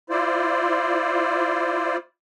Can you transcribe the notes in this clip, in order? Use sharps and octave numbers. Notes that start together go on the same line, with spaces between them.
E4 F4 C5 D5